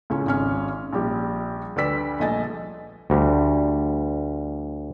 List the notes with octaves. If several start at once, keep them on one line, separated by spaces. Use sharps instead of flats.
C#2 A2 C#4
G#1 G#2 C#4 F6
A#1 G3 G4
D2 G3 B4 D5 E6 B6
A#1 A3 D#5 G#5 A6
D2 G3